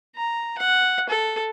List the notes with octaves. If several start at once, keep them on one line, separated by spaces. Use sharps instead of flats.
A#5
F#5
A4